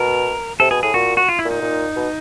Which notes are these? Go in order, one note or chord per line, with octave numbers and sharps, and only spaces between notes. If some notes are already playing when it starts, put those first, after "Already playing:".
Already playing: B2 A#4
C3 A4
B2 G#4
A2 G#4
A#2 F#4
F#4
F4
E4
A#2
D#4
A#2
B2